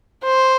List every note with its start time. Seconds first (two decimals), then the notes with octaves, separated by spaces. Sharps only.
0.24 C5